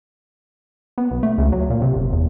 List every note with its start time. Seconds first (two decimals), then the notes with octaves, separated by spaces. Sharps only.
0.98 B3
1.11 B1
1.23 A3
1.38 C#2
1.52 F#3
1.70 A#2
1.82 C3
1.96 F#1
2.12 E2